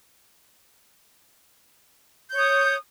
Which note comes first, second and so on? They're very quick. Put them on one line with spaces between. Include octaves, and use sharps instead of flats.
G6 C#5 D#6